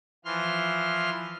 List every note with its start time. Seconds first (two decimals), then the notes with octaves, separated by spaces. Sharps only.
0.25 E3 F3 C6 F6